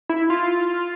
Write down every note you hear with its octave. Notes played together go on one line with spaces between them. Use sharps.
E4
F4